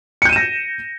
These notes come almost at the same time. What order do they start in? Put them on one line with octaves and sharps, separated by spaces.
C#7 G6 D#7 E7 A#6